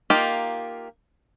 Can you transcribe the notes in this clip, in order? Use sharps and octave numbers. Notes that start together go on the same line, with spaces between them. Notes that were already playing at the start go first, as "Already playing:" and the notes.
A#3 D#4 F4 G4